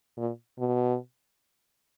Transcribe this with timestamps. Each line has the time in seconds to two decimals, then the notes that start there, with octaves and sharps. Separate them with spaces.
0.17 A#2
0.59 B2